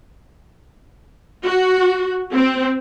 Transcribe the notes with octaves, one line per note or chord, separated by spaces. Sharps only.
F#4
C4